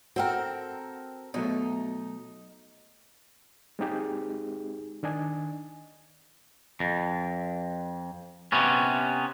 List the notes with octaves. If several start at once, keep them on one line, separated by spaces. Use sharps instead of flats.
C4 F#4 A4 A#4 G5
B2 F#3 A3 D#4
G#3 C4 D#4 G4 G#4
D#3 D4 D#5 G#5
F2
C3 B3 C#4